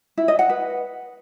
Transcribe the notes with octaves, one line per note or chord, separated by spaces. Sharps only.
E4
D#5
F#5
B4